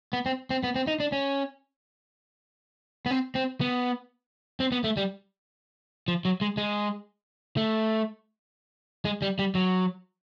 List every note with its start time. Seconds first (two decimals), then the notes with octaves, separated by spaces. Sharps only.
0.13 B3
0.26 C4
0.50 C4
0.63 B3
0.76 C4
0.87 D#4
1.00 D4
1.12 C#4
3.06 B3
3.11 C4
3.35 C4
3.61 B3
4.60 C4
4.72 B3
4.84 A3
4.97 G3
6.08 F3
6.25 F#3
6.41 G#3
6.57 G#3
7.57 A3
9.05 G#3
9.22 G3
9.39 G3
9.55 F#3